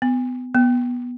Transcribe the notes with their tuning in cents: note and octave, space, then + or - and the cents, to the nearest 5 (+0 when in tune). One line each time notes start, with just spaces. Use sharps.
B3 +30
B3 -10